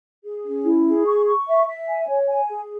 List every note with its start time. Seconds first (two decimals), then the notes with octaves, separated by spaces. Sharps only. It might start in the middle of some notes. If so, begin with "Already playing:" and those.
0.25 G#4
0.45 C#4
0.65 E4
0.86 G#4
1.06 C#6
1.26 C#6
1.47 E5
1.67 E5
1.87 G#5
2.08 C#5
2.28 G#5
2.49 G#4